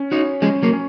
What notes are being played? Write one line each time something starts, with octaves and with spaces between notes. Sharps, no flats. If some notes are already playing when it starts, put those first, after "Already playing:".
Already playing: C#4
D#4 F#4 C#5
F3 G#3 C#4
F#3 A#3
C#4